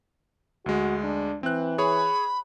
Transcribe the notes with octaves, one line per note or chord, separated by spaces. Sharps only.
D2 G#3 F#4
D4
E3 C4 F#6
G#4 C#5 B5